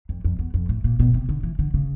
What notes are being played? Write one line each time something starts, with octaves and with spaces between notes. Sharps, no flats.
F2
F2
E2
F2
A2
A#2
B2
C3
D3
E3
D3
C#3